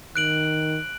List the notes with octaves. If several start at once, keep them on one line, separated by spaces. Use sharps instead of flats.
D#3 F#6 D7 F#7